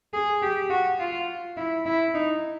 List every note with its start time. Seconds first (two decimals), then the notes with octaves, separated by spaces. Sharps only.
0.13 G#4
0.43 G4
0.70 F#4
0.99 F4
1.57 E4
1.86 E4
2.15 D#4